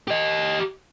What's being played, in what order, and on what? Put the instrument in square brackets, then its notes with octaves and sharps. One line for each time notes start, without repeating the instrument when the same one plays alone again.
[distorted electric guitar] G4 D#5